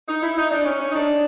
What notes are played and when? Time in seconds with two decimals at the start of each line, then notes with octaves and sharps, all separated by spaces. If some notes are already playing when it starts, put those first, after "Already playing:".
0.08 D#4
0.23 E4
0.37 D#4
0.51 D4
0.66 C#4
0.80 C#4
0.89 D#4
0.95 D4